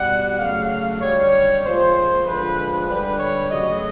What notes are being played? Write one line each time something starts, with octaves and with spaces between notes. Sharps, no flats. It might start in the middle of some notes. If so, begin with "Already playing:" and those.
Already playing: B2 G3 F#5
C#3 F#3 A3 F5
D3 G3 C#5
A#2 F3 G#3 C5
D3 F3 G#3 B4
D3 G3 B4
C#5
C#3 F#3 A3 D#5